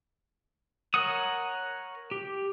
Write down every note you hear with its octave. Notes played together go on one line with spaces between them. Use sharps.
A#4 C#5 F#5 C#6 D#6
G4